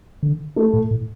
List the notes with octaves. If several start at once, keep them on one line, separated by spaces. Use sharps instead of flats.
D3
A3
A2
A2